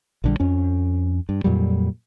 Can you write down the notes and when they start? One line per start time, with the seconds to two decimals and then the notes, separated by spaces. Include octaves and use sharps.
0.24 A#1 D3 G3
0.40 F2 C#4
1.29 G2
1.44 F2 A#2 F#3 G3